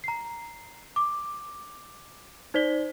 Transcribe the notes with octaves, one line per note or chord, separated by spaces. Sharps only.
A#5 C7
D6
D#4 C5 D5 B6 G7